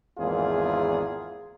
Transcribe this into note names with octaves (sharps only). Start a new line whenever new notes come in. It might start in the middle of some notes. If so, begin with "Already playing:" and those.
G#1 E2 A#3 F4 G#4